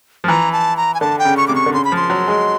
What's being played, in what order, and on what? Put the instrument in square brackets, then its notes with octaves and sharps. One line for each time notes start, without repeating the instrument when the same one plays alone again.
[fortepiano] F3
[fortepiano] E3 [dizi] A#5
[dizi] A5
A#5
G#5
[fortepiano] D3 [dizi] A5
[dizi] G5
[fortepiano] C#3
[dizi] C#6
[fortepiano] C3 [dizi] D6
[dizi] C#6
[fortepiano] D3
[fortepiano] C#3 [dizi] C6
[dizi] B5
[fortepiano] F3 [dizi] C6
[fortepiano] F#3
G#3